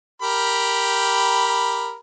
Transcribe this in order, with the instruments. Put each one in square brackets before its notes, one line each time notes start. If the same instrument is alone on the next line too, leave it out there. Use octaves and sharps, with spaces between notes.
[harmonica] G4 A#4 B5